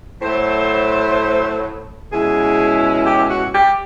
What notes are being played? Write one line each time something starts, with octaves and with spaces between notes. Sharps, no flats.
A2 F#3 A3 C5
B2 G#3 C#4 E4 G#4
G4
F#4
G4